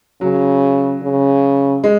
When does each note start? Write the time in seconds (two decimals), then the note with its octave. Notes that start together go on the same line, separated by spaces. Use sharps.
0.21 C#3 F#3
1.03 C#3
1.84 G#3